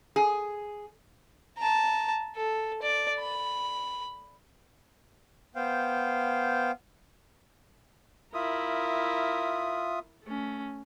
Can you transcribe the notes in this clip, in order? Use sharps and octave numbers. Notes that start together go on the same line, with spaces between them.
G#4
A5 A#5
A4
D5
B5
B3 C5 F5 G5
E4 F4 A#4 E5 D#6
A3 C#4